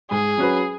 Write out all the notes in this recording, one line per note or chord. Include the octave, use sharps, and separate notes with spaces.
G#2 G#4
F#3 C#4 F#4 B4